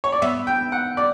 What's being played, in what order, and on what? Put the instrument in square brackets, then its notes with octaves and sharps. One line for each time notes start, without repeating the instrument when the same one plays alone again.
[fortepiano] C#5
D5
[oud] B3 [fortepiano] E5
[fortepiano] G5
F#5
D5